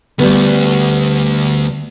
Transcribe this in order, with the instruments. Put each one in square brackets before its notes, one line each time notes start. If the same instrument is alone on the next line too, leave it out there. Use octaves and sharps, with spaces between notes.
[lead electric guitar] D2 [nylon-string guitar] G3 B3